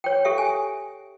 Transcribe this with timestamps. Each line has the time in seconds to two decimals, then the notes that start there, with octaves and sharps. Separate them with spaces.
0.04 C#5 G5
0.25 G4 A4 E5 G5
0.38 G#5